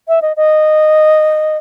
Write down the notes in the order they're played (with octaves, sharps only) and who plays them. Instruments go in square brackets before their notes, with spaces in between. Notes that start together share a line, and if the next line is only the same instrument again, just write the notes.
[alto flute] E5
D#5
D#5